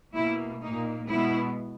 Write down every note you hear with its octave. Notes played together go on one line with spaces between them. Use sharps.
B2 A#3 E4
A#2 A#3 D#4
B2 G#3 B3 E4